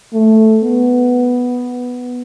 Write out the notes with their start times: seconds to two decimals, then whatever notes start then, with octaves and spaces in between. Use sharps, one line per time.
0.13 A3
0.64 B3